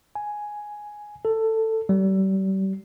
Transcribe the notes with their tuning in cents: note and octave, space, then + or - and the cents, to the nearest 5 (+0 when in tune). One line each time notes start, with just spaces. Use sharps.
G#5 +5
A4 +15
G3 -35